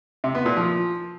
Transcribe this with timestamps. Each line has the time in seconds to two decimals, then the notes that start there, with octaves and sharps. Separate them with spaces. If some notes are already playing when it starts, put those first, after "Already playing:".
0.24 C3
0.35 B3
0.46 A#2
0.57 F3